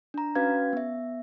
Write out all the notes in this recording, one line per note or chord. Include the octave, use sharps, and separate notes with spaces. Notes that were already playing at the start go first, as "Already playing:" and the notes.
D4 A#5
C#4 F#4 B4 F5 G#6
B3 E5